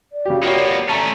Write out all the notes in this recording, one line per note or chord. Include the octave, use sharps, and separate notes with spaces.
D5
C#3 F#3 G4
A#3 B3 F4 G4 C#5
A3 C#4 A5 A#5